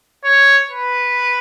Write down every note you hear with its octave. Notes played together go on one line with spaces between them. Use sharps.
C#5
B4